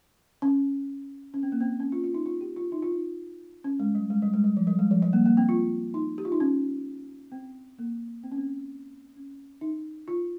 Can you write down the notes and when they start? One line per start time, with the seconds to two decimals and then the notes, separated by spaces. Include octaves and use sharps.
0.42 C#4
1.34 C#4
1.43 C4
1.52 A#3
1.61 C4
1.80 C#4
1.92 F4
2.04 F4
2.14 D#4
2.26 F4
2.41 G4
2.57 F4
2.72 D#4
2.83 F4
2.92 D#4
3.64 C#4
3.80 G#3
3.95 G3
4.10 G#3
4.22 G3
4.33 G#3
4.44 G3
4.57 F3
4.67 G3
4.79 G#3
4.91 F3
5.02 G3
5.13 A#3
5.26 A#3
5.37 C4
5.49 F4
5.94 D#4
6.18 G4
6.25 F4
6.32 D#4
6.40 C#4
7.32 C4
7.79 A#3
8.23 C4
8.31 C#4
8.38 C4
9.17 C#4
9.61 D#4
10.08 F4